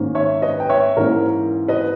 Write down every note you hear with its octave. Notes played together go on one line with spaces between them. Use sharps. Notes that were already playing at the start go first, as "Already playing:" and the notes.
Already playing: G#2 D#3 A#3 C#4
C#5 E5
B4 D#5
G5
C#5 E5
G#2 E3 A#3 C#4 A#4
B4 D#5